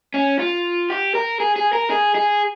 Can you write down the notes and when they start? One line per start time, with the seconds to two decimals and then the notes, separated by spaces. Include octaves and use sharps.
0.14 C#4
0.39 F4
0.90 G4
1.15 A#4
1.40 G#4
1.56 G#4
1.73 A#4
1.90 G#4
2.15 G#4